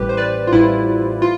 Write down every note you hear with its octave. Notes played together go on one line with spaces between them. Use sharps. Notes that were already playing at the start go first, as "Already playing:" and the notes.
Already playing: A1 A2 G3 G4 B4
C5
B4 D5
F4
A1 A2 G3 E4
F4